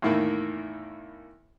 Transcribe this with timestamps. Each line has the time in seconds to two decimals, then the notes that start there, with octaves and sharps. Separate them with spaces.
0.02 E2 A2 D#3 A#3 E4